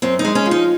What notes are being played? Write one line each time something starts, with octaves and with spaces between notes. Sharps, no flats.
F#2 C4
D#4
G#3
C#4
F3
D#4